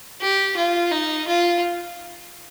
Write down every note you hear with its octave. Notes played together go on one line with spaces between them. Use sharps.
G4
F4
D#4
F4